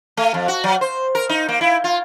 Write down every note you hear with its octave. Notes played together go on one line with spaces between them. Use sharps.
A3
F2
F#4
F#3
C5
A#4
D#4
A#3
E4
F4